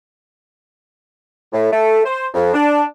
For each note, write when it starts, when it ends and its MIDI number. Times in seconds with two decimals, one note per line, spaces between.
1.53 1.69 45
1.72 2.01 57
2.05 2.28 72
2.34 2.50 41
2.54 2.84 62